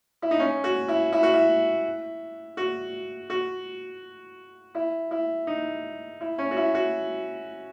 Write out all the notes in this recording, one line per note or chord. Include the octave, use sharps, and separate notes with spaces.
E4
D#4
C#4
F#4
E4
E4
F#4
E4
F#4
F#4
E4
E4
D#4
E4
C#4
F#4
E4
F#4